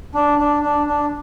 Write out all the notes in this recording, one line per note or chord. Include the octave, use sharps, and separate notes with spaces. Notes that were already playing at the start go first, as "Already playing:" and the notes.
D4
D4
D4
D4